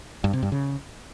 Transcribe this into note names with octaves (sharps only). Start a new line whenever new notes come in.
G2
C3
G2
C#3